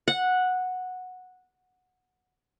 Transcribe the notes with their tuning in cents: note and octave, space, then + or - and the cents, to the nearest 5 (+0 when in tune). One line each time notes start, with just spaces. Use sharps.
F#5 -10